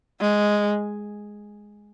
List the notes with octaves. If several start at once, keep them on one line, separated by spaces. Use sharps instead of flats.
G#3